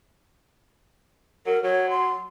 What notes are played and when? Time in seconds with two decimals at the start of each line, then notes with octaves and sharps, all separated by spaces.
1.46 F#3 A#4
1.63 F#3 C#5
1.90 C6